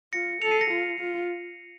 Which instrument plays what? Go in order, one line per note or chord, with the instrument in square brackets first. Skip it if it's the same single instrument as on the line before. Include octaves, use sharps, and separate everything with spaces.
[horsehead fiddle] F4 [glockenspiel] A#6 C#7
[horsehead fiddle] A4 [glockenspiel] C#7 F7
[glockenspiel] C7 D#7
A#6 C#7
[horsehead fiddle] F4
F4